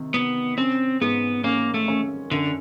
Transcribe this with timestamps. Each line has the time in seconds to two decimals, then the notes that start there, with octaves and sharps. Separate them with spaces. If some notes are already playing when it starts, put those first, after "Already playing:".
Already playing: C3 D#3
0.14 C3 B3
0.58 C4 C#4
1.01 G#2 B3
1.44 A#3 C#4
1.74 A3
1.88 C#4
2.31 F#2 D3